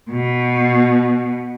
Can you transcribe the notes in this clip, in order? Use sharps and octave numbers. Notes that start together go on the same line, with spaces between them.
B2